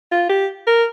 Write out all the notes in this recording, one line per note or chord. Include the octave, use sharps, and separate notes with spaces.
F4
G4
A#4